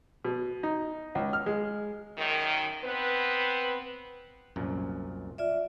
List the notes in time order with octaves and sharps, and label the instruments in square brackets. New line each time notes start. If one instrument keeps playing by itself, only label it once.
[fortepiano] B2
D#4
C#2
F6
G#3
[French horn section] F#2 D#3
B3 C4 B4
[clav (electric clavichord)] C2 F#2 A#2
[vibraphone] F4 D5 E5